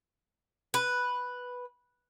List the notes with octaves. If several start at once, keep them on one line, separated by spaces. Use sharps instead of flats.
B4